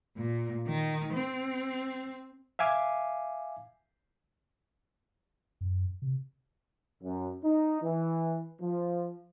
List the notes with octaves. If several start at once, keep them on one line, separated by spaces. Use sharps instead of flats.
A#2
D#3
C4
E5 F5 G#5 D6
F#2
C3
F#2
D#4
E3
F3